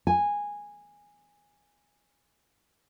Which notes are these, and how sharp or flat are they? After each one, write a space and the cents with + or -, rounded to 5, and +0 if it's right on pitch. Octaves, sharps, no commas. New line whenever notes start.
G#5 -10